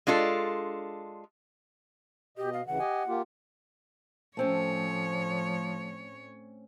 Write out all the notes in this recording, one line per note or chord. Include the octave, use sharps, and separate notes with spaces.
G#3 D4 F4 A4
B2 G4 D#5
F5
D2 C#3 E3 F#5
G4 D#5 G#5
A#3 F4 G4
A2 F3 A3 C4 C#4 C#5